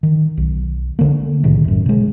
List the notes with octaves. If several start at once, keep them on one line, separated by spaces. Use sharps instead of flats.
D#3
B1
D3 A#3
B1 A2 C3 D#3
F#1 F#2
B2 G#3